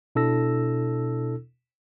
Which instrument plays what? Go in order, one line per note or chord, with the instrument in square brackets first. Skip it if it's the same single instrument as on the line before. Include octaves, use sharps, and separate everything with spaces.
[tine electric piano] B2 D4 E4 A4 E6 A#6